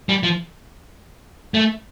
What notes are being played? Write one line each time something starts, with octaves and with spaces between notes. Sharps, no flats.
G3
F3
A3